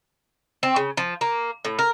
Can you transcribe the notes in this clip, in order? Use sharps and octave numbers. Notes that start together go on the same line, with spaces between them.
C4
C#3
F3
A#3
A2
A#4